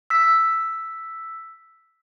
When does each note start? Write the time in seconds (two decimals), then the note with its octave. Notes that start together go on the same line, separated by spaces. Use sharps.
0.10 E6 B6